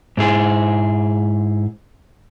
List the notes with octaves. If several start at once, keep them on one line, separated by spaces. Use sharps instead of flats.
G#2 E4 G#4